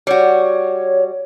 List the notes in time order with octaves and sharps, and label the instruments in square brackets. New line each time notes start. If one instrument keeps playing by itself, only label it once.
[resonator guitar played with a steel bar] G3 F#4 [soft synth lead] C#5